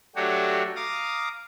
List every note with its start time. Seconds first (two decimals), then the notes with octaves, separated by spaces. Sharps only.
0.16 F#3 A3 D4 F#4 G4 C#5
0.76 F5 A#5 D6 D#6